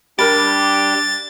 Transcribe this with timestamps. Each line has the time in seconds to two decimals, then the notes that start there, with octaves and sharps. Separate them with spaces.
0.19 G3 D4 G4 A#4 B5 A6